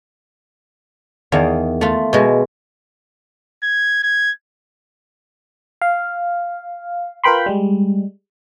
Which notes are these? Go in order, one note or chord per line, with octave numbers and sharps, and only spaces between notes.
E2 D#3 F5
A3 F4
B2 G#3
G#6
G#6
F5
F4 A#4 B4 G5 B5 C6
G3 G#3